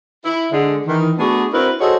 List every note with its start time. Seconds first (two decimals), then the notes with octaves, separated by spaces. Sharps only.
0.24 E4
0.51 D3 G#3
0.87 D#3 E3
1.18 A3 B3 D4 F#4 G#4
1.52 C4 D4 E4 F#4 A#4 B4
1.80 F#4 G#4 A4 C5 C#5 D#5